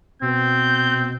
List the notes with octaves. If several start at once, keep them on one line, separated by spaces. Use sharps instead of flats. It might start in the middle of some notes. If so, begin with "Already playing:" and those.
B2 C4 G6